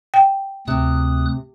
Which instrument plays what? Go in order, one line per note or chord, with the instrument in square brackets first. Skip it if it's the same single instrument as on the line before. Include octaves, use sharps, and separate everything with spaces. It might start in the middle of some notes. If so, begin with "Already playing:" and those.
[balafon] G5
[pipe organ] D2 D#6 F#6 [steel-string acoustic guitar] C3